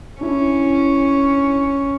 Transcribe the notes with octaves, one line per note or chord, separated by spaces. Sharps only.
C#4 D4 E4